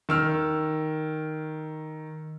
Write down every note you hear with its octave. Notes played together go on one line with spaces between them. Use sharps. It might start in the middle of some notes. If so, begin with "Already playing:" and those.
D#3 E6 F6